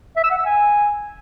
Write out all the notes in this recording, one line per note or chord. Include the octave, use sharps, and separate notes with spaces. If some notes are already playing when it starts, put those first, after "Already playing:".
E5
E6
F#5
E6
G#5